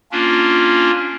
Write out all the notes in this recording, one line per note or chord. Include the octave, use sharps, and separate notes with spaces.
A#3 C#4 D4 F4